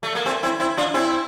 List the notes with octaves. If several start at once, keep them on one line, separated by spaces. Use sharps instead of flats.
A3
A#3
A3 C4
C4 E4
C4 E4
D4 F4
C4 E4